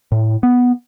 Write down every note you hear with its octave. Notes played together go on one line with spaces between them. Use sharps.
A2
B3